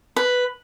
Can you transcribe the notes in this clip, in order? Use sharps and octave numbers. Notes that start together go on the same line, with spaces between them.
B4